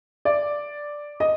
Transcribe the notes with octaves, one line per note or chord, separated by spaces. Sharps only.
D5
D#5